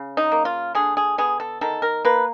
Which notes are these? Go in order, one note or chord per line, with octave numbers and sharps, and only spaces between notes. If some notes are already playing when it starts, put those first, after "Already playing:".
Already playing: C#3
D#4
A#3
F4
D3 G#4
G#4
B3 G#4
A4
D#3 A4
A#4
A#3 B4